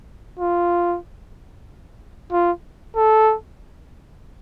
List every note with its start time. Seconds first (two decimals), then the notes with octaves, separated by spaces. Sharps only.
0.39 F4
2.32 F4
2.96 A4